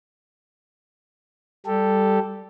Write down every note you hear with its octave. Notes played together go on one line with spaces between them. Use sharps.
G3 G4 A4